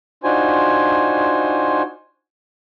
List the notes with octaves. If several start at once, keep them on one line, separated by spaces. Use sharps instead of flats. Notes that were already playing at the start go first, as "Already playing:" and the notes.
D4 D#4 F4 F#4 C5 G#5